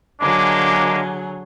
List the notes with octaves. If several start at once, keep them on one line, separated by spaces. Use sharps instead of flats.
D3 F#3 G#3 A#3 D4 G#4 D6